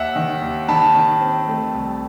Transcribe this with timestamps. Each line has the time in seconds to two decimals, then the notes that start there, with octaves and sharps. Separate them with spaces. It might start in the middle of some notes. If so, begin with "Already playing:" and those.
Already playing: D#2 E5 F#5
0.16 D#3
0.42 D#2
0.68 D#3 A5 B5
0.94 D#3
1.21 C4
1.47 A3
1.73 C2